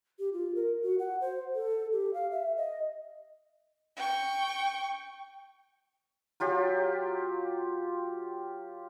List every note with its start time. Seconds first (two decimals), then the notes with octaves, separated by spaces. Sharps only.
0.19 G4
0.33 F4
0.55 A#4
0.82 F#4
0.99 F#5
1.21 C5
1.55 A4
1.92 G4
2.14 F5
2.31 E5
2.57 D#5
3.96 G5 C#6
6.40 F#3 F4 G4